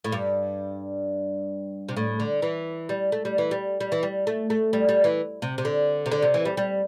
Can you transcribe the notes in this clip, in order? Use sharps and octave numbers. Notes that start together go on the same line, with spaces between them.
A2
G2
C3
A2
D3
E3
G3
A3
G3
E3
G3
G3
E3
G3
A3
A3
G3
G3
E3
C3
C3
D3
C3
D3
C3
E3
G3
G3